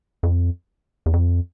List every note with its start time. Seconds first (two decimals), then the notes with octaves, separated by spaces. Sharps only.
0.23 F2
1.06 E2
1.13 F2